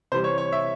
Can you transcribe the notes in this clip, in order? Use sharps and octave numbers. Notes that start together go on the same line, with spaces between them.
C3 E3 G3 C5
C#5
C#5
E5